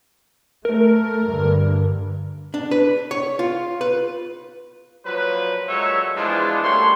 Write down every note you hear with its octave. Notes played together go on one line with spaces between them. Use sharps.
A3 A#4
G2 D3
D4
B4
C#5
F4
B4
A#2 F3 F#3 B4
A#2 F#3 G#3 A4 C#5 E5
E3 F3 G#3 B3 D4 F4
F#2 G3 A3 F#4 C#5 C6